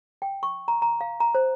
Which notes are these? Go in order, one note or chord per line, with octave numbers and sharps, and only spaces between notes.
G5
C#6
A#5
A#5
F5
A#5
C5